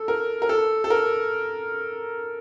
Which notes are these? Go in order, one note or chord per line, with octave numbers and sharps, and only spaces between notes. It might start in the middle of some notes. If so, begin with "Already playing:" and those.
Already playing: A4
A#4
A#4
A4
A4
A#4